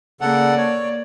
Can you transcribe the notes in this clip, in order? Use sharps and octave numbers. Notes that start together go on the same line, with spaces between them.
C#3 A#3 A4 D5 F#5
C#5